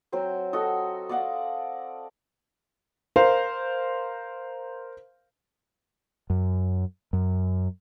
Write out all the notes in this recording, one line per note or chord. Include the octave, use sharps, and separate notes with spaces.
F#3 C4 G5 C6
F#4 A4 D#5
D5 D#5 F5 F#5
A#4 C5 F5
F#2
F#2